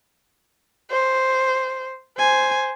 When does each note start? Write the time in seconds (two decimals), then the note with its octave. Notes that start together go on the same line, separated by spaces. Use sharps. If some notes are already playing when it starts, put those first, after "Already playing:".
0.91 C5
2.19 C5 G#5